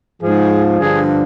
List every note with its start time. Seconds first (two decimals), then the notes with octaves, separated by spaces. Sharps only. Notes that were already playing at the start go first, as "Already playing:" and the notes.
0.22 G#2 F3 G#4
0.79 G2 D3 F3 G#4